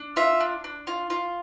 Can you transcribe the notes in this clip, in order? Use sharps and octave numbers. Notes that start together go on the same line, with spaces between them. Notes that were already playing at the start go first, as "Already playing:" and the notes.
Already playing: D4
F4 E5
D4
D4
F4
F4